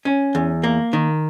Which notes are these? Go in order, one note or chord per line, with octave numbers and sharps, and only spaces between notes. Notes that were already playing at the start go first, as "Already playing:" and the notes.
C#4
E2
A#3
D#3